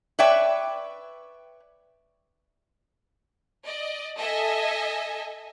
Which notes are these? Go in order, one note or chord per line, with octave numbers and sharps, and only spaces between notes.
B4 C#5 D5 E5 G5
D5 D#5
A4 D#5 E5 G#5